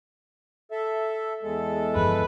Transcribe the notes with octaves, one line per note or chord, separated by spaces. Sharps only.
A4 E5
E2 G#3 A4
G1 F2 B4